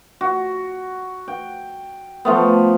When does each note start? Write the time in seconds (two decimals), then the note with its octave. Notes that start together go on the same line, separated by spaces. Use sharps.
0.21 F#4
1.28 G5
2.25 F3 A3 B3